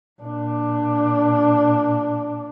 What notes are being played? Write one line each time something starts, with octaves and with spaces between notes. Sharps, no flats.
A#2 D4